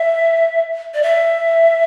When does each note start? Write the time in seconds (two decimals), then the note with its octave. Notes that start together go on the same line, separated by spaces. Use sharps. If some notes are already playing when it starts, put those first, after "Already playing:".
Already playing: E5
0.94 D5
1.03 E5